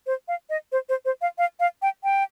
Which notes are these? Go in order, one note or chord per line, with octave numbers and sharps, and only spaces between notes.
C5
F5
D#5
C5
C5
C5
F5
F5
F5
G5
G5